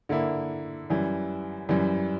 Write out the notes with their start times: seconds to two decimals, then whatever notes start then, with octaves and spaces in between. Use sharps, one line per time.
0.09 D3 A#3 E4
0.90 F#2 E3 G3
1.69 F#2 E3 G3